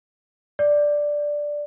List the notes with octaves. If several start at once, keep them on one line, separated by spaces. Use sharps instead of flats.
D5